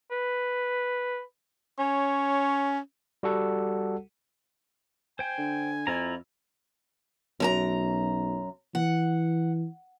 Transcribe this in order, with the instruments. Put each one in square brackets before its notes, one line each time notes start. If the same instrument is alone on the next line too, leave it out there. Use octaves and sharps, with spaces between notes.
[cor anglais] B4
[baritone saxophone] C#4 [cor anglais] C#5
[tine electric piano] G3 F#4 A4 F#5
[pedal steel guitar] C5 G5 [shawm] G#5
[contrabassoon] D3
[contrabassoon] F2 [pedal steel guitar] E4 F4 A#5
[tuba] B1 [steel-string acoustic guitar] F#2 A4 A#5
[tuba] E3 [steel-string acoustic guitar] F#5